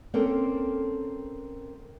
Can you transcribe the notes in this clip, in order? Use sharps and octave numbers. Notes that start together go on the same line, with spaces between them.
A#3 C4 C#4 A4 A#4